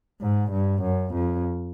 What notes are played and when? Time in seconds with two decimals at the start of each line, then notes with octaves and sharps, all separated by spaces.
0.22 G#2
0.52 G2
0.83 F#2
1.14 F2